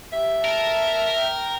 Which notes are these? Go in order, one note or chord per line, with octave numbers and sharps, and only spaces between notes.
G4 E5
A#4 A5
G5